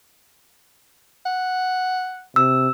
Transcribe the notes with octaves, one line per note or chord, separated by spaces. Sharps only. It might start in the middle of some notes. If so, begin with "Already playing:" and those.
F#5
C3 E6